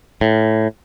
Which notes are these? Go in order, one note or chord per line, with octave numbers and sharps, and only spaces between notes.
A2